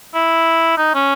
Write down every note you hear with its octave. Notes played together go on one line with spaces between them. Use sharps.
E4
D#4
C#4